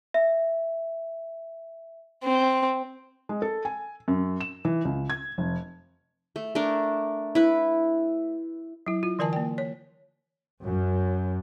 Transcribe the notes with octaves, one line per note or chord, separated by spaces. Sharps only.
E5
C4
G#3
A4
G#5
F#2
E7
E3
C#2
G#6
F1
A3
A3 D4 A#4
E4 B4
F#3 E4
F4
D3 E3 A#4 D5 G#5 A5
A#3 G5
C#5
F#2